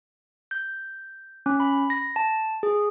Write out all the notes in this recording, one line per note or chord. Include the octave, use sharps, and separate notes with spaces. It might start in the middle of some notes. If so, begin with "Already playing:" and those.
G6
C#4
B5
A#6
A5
G#4